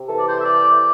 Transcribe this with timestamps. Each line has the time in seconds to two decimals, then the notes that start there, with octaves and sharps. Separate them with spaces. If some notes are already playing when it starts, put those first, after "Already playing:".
Already playing: C3
0.08 E3 A4
0.18 D5
0.26 C5
0.38 E5
0.44 D5